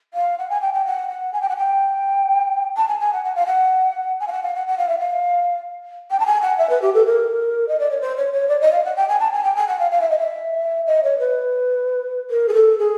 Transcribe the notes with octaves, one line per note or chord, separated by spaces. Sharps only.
F5
F#5
G#5
G5
G5
F#5
F#5
G#5
G5
F#5
G5
A5
G#5
G#5
F#5
F#5
F5
F#5
G#5
F5
F#5
F5
F#5
F#5
F5
E5
F5
G5
A5
G#5
F#5
E5
B4
G4
A4
A#4
D#5
D5
C#5
C5
C#5
C#5
D5
D#5
F5
F#5
G5
G#5
A5
G#5
G5
G#5
F#5
F5
F5
E5
D#5
E5
D#5
C#5
B4
A#4
G#4
A4
G#4